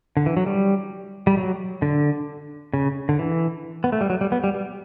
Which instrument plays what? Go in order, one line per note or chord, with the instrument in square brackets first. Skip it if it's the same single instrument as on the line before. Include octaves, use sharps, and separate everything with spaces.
[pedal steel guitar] D3
E3
F#3
G3
G3
F#3
D3
C#3
D3
E3
B3
A3
G3
F#3
G3
B3
G3
G3